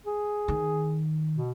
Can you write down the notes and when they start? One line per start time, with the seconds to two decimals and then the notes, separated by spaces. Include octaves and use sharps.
0.06 G#4
0.48 D#3
1.35 B2